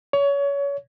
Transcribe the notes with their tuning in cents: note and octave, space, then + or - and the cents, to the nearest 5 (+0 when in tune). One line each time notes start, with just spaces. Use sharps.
C#5 +25